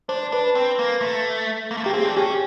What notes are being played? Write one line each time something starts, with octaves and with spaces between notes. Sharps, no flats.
D4 C5
D4 B4
C4
A#3
A3
A#3
A3
A#3 G4
C4 G#4
D4
C#4 G4